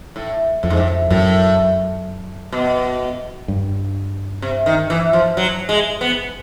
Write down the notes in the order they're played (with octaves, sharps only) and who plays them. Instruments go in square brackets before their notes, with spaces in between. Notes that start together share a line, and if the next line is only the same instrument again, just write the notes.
[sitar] A2
[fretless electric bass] F2 [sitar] A2
[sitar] G#2
A2
[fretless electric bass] F#2 [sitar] A2
[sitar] B2
[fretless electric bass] G2
[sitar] C3
D#3
E3
F3
F#3
G#3
B3